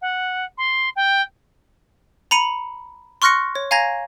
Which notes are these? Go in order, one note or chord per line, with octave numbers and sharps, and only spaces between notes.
F#5
C6
G5
A#5 B5 C#7 D#7 F#7
C6 C#6 F6 F#6 A#6 C#7
C#5
F5 G#5 A#5 G#6 A#6